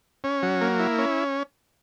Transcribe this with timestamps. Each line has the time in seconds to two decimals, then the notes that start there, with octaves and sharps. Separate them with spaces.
0.24 C#4
0.43 F#3
0.61 A#3
0.80 E4
0.98 C#4